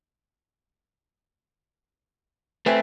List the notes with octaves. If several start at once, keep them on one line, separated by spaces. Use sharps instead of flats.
A3 C4 B4 E5 G#5